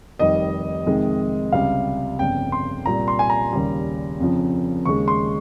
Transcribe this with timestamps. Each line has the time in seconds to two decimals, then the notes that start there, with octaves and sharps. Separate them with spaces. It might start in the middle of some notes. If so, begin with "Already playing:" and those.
0.19 F1 F2 D#3 G3 D#5
0.86 F2 C3 D#3 G#3
1.52 C#2 C3 G3 F5
2.19 G1 F2 C#3 G5
2.52 C6
2.86 C2 A#2 G3 A#5
3.08 C6
3.19 G#5
3.30 A#5
3.52 D#2 C#3 G3
4.19 F1 F2 C#3 F3
4.85 D#2 C#3 G#3 C#6
5.08 C6